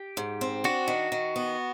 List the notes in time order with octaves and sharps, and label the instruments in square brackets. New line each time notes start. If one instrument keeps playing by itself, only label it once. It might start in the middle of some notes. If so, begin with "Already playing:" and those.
Already playing: [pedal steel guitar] G4
[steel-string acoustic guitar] G#2
C4
[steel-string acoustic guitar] D4 [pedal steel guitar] F#4
[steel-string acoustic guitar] D#3
D#3
B3